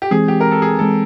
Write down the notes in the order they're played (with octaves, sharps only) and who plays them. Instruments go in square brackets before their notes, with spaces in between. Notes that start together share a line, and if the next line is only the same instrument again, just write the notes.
[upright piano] G4
[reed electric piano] E3 G#3 C4 [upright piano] G#4
[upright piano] G4
A#4
A4
G#4
[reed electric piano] E3 G#3 C4 [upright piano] A4